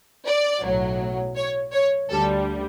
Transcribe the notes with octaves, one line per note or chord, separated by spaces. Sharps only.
D5
B1 A2 F#3
C#5
C#5
D2 D3 G3 A4